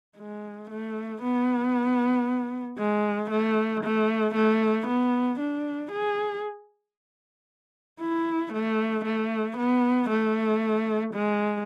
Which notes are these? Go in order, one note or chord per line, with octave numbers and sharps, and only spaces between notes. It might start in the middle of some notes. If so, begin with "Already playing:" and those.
G#3
A3
B3
G#3
A3
A3
A3
B3
D4
G#4
E4
A3
A3
B3
A3
G#3